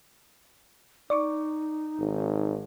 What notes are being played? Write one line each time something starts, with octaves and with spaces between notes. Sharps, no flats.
D#4 D5 C#6 D6
G#1